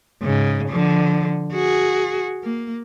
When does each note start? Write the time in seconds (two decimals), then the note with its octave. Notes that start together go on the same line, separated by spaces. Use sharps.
0.22 G#2 C#3
0.69 D3 F3
1.53 F#4 G#4
2.44 A#3